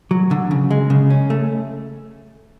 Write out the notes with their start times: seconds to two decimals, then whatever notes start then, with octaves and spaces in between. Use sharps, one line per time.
0.11 F#3
0.31 D3
0.51 C#3
0.71 G#3
0.90 C#3
1.10 C#4
1.30 A3